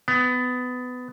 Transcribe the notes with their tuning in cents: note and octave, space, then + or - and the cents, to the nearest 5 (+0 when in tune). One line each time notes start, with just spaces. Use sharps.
B3 +20